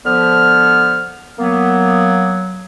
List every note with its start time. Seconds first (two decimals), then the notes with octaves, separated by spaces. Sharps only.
0.06 D3 F3 B3 F6
1.39 F#3 A#3 B3